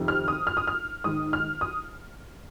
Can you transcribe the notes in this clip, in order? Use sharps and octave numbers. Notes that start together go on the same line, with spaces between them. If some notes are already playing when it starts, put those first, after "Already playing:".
Already playing: F2 C3 D#3
F6
D#6
F6
D#6
F6
G#2 D#3 D#6
F6
D#6